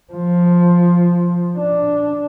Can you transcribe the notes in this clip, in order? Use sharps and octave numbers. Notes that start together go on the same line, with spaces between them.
F3
D4